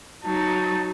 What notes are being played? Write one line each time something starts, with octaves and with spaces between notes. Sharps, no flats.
F#3 D#4 A5